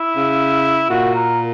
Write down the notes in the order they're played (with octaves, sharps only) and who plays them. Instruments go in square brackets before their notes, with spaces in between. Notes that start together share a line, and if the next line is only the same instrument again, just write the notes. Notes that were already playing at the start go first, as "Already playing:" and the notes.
Already playing: [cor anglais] E4
[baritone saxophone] C#3
[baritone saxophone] A#2 [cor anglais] F#4
[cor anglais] A#4